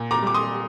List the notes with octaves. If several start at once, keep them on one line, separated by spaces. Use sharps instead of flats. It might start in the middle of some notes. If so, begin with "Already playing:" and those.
Already playing: A#2
A#5 D6
G3 D6
C6 D#6